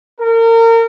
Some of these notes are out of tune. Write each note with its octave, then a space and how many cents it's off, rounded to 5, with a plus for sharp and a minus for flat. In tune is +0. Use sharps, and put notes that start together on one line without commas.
A#4 -30